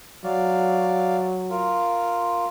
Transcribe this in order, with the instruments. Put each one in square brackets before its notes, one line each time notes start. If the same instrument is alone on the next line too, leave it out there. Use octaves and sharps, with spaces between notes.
[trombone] F#3 [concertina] D5 F5
[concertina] F4 A#4